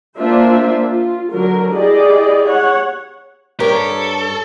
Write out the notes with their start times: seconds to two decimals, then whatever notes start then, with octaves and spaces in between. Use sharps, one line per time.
0.18 A#3 D4 F4 C5 E5
0.83 F4
1.31 D3 F#3 A#4
1.74 E4 G4 G#4 D5 D#5
2.45 C#5 F#5
3.60 G2 G4 A#4 C#5
3.76 A4